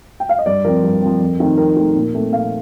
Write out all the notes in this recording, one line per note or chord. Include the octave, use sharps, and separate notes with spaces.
G5
F5
D#5
G2 D5
F3 C4 A#4
G2
F3 C4
F2
D#3 A3 C4
F2 A#4
D#3 A3 C4
A#2
A3 C4
A#2 F5